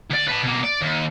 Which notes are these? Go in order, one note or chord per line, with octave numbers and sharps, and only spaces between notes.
D2 D5
B4 A5
B2 A#3
D5
D#2